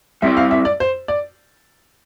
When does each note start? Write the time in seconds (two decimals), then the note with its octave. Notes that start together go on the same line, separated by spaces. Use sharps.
0.22 G3 C4 E4 G4 D5 E5
0.37 F5
0.51 E5
0.65 D5
0.80 C5
1.08 D5